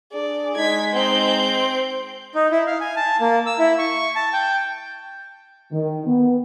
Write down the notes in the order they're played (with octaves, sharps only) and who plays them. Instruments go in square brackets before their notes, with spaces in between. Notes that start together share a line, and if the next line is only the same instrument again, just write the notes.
[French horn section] D4 G#4 [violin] D5
[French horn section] G#3 D#4 [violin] G#6 B6
[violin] C4 G6
[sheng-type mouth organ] D#4
E4
F5
G#5
A5
A#3
E6
E4
C#6
A5
G5
[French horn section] D#3
B3